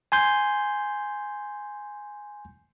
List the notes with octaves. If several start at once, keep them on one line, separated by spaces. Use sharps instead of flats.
G#5 C6 G6